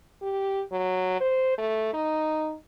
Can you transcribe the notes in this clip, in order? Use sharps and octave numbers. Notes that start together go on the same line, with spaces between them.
G4
F#3
C5
A3
D#4